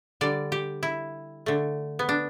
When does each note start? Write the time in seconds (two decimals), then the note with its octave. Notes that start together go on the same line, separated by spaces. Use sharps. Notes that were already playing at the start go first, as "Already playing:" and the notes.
0.21 D3 G3 D5
0.52 G4
0.83 E4
1.46 D3 A3
1.99 B3
2.09 D4